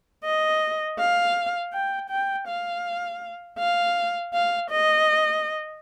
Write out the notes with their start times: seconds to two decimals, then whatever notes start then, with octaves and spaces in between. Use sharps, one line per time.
0.24 D#5
1.00 F5
1.73 G5
2.10 G5
2.48 F5
3.59 F5
4.33 F5
4.71 D#5